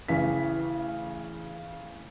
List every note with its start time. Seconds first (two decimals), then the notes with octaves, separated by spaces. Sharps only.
0.08 A1 C#3 E3 B6